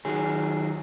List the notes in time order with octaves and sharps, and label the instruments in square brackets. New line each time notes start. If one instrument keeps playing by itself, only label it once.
[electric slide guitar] D#3 F#3 G#4